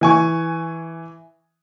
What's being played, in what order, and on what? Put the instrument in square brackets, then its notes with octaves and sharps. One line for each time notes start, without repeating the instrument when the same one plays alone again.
[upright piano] E3 G#5 C#6